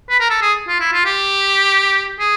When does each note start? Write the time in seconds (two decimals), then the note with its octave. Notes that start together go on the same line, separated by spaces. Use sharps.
0.10 B4
0.20 A#4
0.30 A4
0.42 G#4
0.68 F4
0.80 E4
0.93 F4
1.05 G4
2.19 G#4